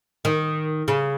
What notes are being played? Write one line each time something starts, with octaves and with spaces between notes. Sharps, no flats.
D#3
C#3